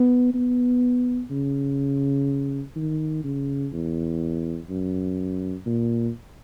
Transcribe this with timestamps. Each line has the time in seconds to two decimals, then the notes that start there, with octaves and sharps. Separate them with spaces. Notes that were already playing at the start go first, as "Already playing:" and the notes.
Already playing: B3
0.34 B3
1.30 C#3
2.76 D#3
3.24 C#3
3.73 E2
4.69 F#2
5.66 A#2